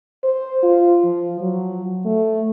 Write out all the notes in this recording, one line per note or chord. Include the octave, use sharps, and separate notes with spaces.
C5
F4
F3
F#3
A3